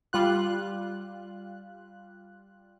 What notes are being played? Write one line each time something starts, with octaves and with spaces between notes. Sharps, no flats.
G3 F4 F#6